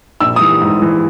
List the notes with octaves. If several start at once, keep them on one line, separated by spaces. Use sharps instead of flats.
A#1 E6
E3 D#6
G#2
E3